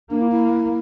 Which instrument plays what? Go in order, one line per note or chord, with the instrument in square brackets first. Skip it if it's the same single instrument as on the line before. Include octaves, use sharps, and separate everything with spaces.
[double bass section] A#3 [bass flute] D4
[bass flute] E4
E4